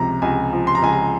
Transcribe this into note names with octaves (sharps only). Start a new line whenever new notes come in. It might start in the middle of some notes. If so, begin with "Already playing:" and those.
Already playing: C#2 C3 F3 A#5
C#2 G#5
F3
C6
A#5
C#2 G#5
A#5